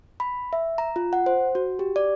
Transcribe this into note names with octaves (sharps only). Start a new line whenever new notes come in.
B5
E5
A#5
F4
F#5
C5
F#4
G4
D5